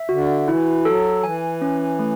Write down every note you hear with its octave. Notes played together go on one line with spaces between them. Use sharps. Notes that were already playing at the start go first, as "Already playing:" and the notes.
Already playing: E5
D3 F#4
E3 E4
F#3 A4
E3 G#5
C#4
A3